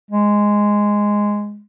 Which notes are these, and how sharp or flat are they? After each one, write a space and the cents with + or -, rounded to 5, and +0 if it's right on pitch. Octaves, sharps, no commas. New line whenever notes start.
G#3 -5